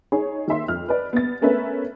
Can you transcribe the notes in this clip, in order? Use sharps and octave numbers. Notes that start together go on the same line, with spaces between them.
D#4 G#4 C#5
D#3 A#3 E5 C6
F2 F6
B4 D5
B3 A6
A3 B3 C#4 A#4 B4 E5